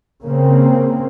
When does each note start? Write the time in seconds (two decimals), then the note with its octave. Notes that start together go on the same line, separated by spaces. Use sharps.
0.24 C#3 A#3 C4